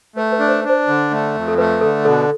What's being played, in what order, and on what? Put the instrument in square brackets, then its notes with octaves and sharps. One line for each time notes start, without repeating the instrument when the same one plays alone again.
[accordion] A3 [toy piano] B4
[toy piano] B4
[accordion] D4
[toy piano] C5
[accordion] D4
[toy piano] C5
[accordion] D3
A3
F2
[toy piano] A4
[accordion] A3 [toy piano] B4
[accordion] D3 [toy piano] A4
[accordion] B2 [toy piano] A4